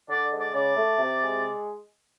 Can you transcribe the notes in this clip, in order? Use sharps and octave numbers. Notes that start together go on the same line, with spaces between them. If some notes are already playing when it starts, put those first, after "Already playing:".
D3 D5
G#3
D5
C#3 D5
A3
C3
G#3